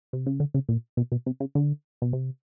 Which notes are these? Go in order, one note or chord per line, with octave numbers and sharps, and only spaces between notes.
C3
C#3
D3
C#3
A#2
B2
B2
C3
C#3
D3
B2
C3